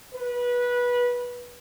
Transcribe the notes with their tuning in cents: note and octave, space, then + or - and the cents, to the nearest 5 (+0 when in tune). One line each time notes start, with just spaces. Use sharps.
B4 -20